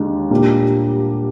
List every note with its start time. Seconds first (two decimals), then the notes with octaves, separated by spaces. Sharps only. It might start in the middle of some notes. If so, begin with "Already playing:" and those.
Already playing: D#2 D3 G#3 D4
0.30 A#2 G3 A#3 D4